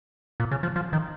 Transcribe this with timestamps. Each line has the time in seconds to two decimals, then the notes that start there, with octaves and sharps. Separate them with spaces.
0.40 A#2
0.51 C#3
0.63 F3
0.76 F3
0.93 D#3